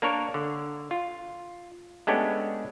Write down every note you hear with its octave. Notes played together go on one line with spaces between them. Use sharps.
A#3 D4 A#4 C#5
D3
F4
G#3 A3 B3 C#4 D4 G4